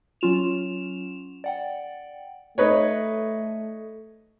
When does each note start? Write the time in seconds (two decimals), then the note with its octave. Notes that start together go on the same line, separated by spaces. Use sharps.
0.21 F#3 C#4 F4 E7 F7
1.44 D5 F#5 G5
2.58 A3 D#4 B4 C#5